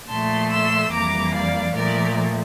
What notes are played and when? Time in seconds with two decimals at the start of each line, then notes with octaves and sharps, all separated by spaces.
0.09 A#2 F3 A3 A5 C6
0.51 C6 E6
0.92 F2 E3 G3 A#3 A#5 D6
1.33 D5 F5
1.75 A#2 F3 A3 A#4 D5